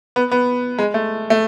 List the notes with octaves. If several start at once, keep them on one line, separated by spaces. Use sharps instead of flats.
B3
B3
G#3
A3
A3